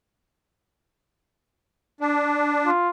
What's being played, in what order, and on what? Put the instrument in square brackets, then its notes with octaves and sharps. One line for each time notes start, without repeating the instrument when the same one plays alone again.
[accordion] D4
[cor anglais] F4